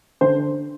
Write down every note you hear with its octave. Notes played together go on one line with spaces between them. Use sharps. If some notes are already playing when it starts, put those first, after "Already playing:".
D3 C5